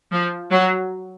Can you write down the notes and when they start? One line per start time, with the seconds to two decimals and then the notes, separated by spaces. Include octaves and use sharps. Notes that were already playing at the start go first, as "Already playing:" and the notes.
0.11 F3
0.50 F#3